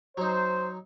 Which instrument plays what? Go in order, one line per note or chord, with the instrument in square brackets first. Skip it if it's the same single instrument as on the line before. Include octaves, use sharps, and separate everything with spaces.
[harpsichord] F#3 D#4 [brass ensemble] C5